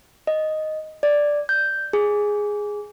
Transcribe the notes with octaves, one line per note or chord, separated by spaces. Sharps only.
D#5
D5
G6
G#4